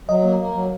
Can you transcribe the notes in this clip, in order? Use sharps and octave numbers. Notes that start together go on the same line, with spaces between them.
F#3 D#5
A#3
A#3
F#3